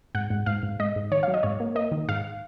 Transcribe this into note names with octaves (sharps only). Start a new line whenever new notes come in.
G#2 F#5
G#2
G#2 F5
G#2
G#2 D#5
G#2
D#3 C#5
F#3 F5
D#5
G#2 C#5
A#3
A#3 D#5
D#3
G#2 F5